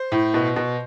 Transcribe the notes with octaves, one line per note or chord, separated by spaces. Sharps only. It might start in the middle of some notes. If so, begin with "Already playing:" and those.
Already playing: C5
A2
B2
B2